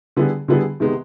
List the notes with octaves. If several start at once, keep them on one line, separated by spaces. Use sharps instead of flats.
D3 G3 B3 E4 G#4
D3 G3 B3 E4 G#4
C3 D#3 G#3 B3